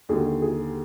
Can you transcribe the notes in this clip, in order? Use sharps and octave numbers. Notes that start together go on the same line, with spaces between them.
D#2 D3 G3 G#4
G#4